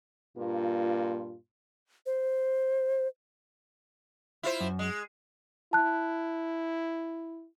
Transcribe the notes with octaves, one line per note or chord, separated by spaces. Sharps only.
G2 A#2 A#3 F4
C5
E4 F4 C5
F#2
G#3
E4 A5 F#6